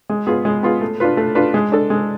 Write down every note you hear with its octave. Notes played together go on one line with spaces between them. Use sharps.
G#3
B3 F4 G#4
G#3
B3 F4 G#4
A3
D4 F4 B4
A3
D4 F4 B4
G#3
D4 A4
G#3